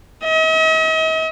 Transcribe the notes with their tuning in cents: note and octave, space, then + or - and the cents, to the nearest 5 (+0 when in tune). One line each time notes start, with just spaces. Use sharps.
D#5 +45